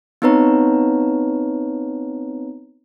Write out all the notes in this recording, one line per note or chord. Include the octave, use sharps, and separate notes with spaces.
B3 C4 D#4 B4 C#5 A#5